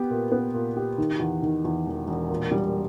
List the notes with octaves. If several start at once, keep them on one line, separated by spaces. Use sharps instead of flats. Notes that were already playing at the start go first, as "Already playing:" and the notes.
Already playing: B3 G4
A#2
B3
A#2
G4
D#3
E2
D#3
E2
E1
E1
A#2
G3